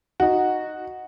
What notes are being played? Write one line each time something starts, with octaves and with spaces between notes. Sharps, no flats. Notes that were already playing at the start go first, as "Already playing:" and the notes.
D#4 F#4